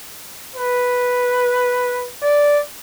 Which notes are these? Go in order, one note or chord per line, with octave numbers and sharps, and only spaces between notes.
B4
D5